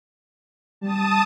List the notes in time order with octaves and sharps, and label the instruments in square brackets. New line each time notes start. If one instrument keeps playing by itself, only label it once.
[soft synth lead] G3 [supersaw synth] A5 D#6